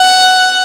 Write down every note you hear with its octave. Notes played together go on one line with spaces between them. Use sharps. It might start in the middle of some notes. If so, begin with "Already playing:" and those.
Already playing: F#5